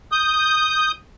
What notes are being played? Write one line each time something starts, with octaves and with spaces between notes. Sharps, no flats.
D#6 G6